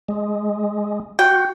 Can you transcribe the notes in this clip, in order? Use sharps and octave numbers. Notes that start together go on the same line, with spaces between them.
G#3
F#4 G5